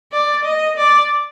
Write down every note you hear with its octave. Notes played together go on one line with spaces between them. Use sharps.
D5
D#5
D5